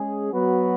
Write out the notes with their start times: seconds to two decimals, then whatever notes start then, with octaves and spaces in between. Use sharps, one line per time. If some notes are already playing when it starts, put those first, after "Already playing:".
Already playing: G#3 C#4 G#4
0.33 F#3 B3 F#4 B4